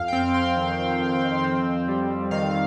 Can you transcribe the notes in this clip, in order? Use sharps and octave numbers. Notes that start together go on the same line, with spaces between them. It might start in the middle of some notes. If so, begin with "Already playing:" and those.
Already playing: F2 F5
G5
C4 F5
C6
D#3
F2
C4
G3
D#3 F5